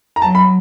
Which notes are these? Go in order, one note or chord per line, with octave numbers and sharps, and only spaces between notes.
A#5
F#3 A5
B5